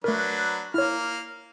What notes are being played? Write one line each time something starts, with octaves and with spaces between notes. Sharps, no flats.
F#3 A3 D4 A#4 B4
A#3 E4 C#5 F6